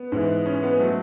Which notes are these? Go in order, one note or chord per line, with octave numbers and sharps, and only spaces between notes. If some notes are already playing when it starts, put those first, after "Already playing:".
Already playing: B3
G#2 E3
C#4
B3
F#3 A3